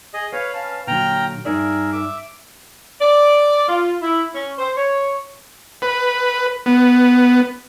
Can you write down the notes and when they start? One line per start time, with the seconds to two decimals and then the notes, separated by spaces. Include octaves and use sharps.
0.14 G#4 D#5
0.33 B4 C#5 F5
0.54 C#4 F5 A5
0.87 A#2 D3 F#3 G5 A#5 F6
1.45 G2 D#4 G#4 A#4 D5 E5
1.93 E5 D6
3.01 D5
3.68 F4
4.02 E4
4.34 C#4
4.58 C5
4.76 C#5
5.82 B4
6.66 B3